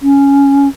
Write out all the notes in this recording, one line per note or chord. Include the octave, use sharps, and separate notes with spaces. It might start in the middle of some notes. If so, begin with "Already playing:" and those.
C#4